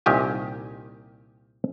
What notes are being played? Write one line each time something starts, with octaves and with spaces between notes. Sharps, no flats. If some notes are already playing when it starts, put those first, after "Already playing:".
C2 A#2 D#3 G4 G#5